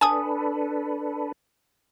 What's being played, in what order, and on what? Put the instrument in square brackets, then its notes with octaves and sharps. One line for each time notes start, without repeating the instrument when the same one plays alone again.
[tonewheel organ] D4 A4 B4 [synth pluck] G#5 A5 D#6